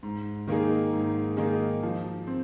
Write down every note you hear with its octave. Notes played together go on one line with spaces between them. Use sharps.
G#2
D#3 A#3 D#4 G#4
G#2
D#3 A#3 D#4 G#4
F3
C4